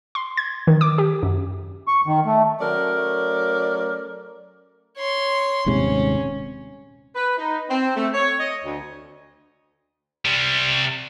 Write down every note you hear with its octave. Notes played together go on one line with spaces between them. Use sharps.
C6
G#6
D#3
D6
G4
F#2
C#6
D#3
A3
F#3 A3 C#4 A#4 D5
C#5 C6
D#1 G#2 C3 C#4
B4
D#4
C4
A3
C#5
D#5
D2
C3 G3